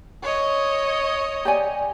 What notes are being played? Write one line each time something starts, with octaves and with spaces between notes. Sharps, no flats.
C#5 D#5
G4 D5 G#5